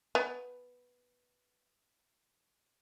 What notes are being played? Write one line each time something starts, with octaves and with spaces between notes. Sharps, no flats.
B3 G#5